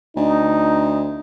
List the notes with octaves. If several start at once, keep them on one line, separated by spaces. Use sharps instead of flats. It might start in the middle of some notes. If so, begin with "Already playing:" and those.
D2 D#4